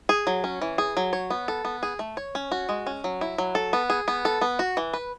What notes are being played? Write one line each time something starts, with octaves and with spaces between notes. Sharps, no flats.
G#4
F#3
C#4
E3
G#4
F#3
C#5
B3
A4
B3
G#4
A3
C#5
C#4
F#4
G#3
C#4
F#3
E4
F#3
A4
B3
G#4
B3
A4
B3
F#4
E3
B4